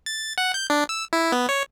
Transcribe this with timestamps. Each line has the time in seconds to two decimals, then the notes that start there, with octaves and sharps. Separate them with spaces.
0.06 A6
0.38 F#5
0.54 G6
0.70 D4
0.89 E6
1.13 E4
1.32 B3
1.49 C#5